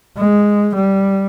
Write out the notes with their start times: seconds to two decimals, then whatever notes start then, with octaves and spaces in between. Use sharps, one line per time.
0.17 G#3
0.75 G3